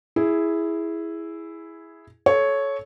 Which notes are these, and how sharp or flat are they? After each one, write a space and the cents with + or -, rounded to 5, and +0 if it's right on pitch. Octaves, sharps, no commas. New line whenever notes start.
E4 +0 G#4 +0
A4 -20 C#5 +0